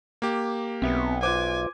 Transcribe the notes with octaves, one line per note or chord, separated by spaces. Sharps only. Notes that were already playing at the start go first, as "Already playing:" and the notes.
A#3 G4
B1 B3 C4 E5
F4 B4 C5 G#5 D6